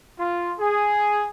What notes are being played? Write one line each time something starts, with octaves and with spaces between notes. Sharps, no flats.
F4
G#4